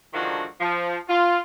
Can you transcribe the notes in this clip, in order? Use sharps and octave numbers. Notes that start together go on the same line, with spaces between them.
G#2 D3 D#3 F3 D4 F#4
F3
F4